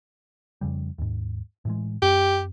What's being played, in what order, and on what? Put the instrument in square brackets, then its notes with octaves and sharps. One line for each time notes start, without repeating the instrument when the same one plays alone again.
[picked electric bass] F2 C#3 G3
D#2 G#2
A2 E3 G#3
[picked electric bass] F#2 C4 [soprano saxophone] G4